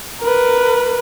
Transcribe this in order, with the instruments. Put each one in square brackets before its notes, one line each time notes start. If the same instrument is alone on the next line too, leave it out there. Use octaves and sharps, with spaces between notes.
[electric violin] A#4 B4